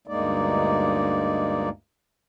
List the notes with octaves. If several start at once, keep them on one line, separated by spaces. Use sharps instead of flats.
D2 G2 G#3 A#3 D#4 D5